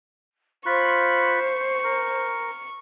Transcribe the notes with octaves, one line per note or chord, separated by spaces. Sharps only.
F4 C5 B5 C#6 F#6
A#4